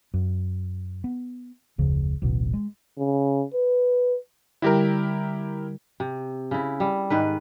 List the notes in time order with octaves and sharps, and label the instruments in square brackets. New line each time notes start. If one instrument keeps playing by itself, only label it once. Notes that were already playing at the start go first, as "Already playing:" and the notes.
[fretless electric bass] F#2
B3
F1 D2 C#3 F3
D1 A1 B2
G#3
[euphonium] C#3
B4
[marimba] D3 G3 [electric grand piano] E4 G4 A#4
[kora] C3
C#3 E4
G3
G#2 D#3 B4